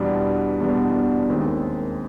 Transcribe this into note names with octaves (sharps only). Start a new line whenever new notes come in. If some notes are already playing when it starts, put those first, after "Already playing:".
Already playing: E2 B2 G3 B3 D4
E2 B2 G3 B3 D4
D#2 D#3 G#3 C4